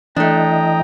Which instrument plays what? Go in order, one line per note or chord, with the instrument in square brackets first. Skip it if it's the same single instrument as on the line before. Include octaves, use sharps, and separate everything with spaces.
[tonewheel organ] E3 D#5 [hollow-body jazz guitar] A3 D4 [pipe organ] G5 A#5